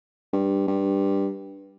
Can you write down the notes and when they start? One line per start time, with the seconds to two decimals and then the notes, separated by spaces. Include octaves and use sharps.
0.33 G2
0.67 G2